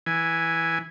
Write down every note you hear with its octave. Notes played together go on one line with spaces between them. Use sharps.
E3 G#5